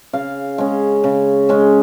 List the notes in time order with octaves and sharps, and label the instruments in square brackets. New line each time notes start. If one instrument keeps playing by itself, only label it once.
[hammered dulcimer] C#3 F5
G#3 C#4
C#3
G#3 C#4